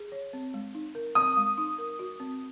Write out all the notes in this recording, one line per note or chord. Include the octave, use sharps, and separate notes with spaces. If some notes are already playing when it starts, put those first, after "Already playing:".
Already playing: G#4
C#5
C4
G#3
D#4
A#4
C4 D#6
G#3
D#4
A#4
F#4
C4